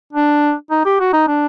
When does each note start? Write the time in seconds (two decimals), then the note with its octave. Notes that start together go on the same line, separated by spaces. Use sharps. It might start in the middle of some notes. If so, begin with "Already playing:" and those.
0.13 D4
0.71 D#4
0.85 G4
1.00 F#4
1.13 D#4
1.28 D4